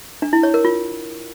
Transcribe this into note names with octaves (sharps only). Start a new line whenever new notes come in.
D4
E4
C#5
A#4
F4